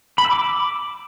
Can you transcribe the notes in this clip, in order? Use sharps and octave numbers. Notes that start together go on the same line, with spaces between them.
B5
E6
D6